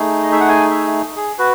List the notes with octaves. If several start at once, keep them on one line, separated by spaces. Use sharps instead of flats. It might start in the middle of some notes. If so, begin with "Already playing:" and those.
Already playing: A3 D#4 G#4
D#5
E5
F#5
G#5
E5
G#4
F#4 B4